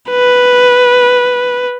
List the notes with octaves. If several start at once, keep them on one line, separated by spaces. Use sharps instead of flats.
B4